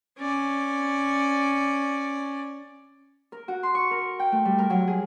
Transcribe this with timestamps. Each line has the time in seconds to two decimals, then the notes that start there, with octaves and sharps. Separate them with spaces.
0.18 C#4 D5
3.32 A#4
3.48 F#4
3.63 C6
3.75 C#6
3.91 A#4
4.19 G5
4.32 A3
4.45 G3
4.58 A#4
4.70 F#3
4.87 G#4